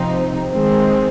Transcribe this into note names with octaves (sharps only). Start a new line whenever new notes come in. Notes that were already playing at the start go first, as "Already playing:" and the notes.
Already playing: C3 F3 C4 D#4
D#3 G#3 C4